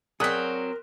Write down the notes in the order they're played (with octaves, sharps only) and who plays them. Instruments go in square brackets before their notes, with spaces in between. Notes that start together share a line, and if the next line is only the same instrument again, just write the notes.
[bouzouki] F#3 C4 [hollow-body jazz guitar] G#4 D5 [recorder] A#4 [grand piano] D#6 F#6 B6